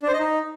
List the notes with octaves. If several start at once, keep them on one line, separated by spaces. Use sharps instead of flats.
D4
C5
D#5
D#4